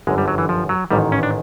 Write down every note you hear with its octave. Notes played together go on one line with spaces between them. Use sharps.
G1 F#2 D3 G#3
G3
F#3
E3
F3
F#3
A1 G#2 D#3 G3
C#4
D4